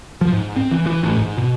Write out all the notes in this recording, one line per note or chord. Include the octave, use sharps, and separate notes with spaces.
F3
G#2
C4
E3
E3
A1
G#2
B2